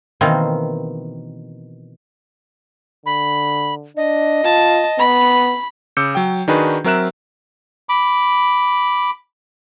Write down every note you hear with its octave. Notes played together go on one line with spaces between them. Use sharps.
B2 D#3 E3 A#3 C4
D3 B5
D4 D#5
F4 A5
B3 B5
C#3 D6 E6 G6 C#7
F#3 G5
D#3 D4 D#4 F#4 G#4 B4
F#3 C4 A#4 E5 F#6 E7
B5 D6